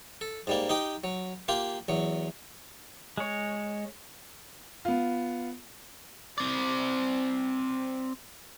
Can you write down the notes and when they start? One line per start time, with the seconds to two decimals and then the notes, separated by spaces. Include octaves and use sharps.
0.21 A4
0.47 G#2 G3 A#3
0.69 D#4 G4 G5
1.04 F#3
1.48 A#3 F4 G4
1.88 E2 F#3
3.17 G#3 C#5
4.85 B3 F4
6.38 C4 D5